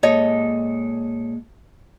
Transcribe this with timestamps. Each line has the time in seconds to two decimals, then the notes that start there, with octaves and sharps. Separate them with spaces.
0.03 A#2 G#3 A4 C#5 D#5